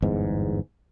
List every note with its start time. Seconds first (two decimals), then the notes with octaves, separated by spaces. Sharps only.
0.02 G1 E2 G#2